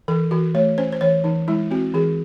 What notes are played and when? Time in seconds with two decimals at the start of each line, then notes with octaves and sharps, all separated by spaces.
0.08 E3 A4
0.31 E3 F#4
0.55 A3 C#5
0.78 C#4 C5
0.92 C5
1.01 E3 C#5
1.24 E3 D#4
1.48 G#3 E4
1.71 C4 F#4
1.94 E3 G#4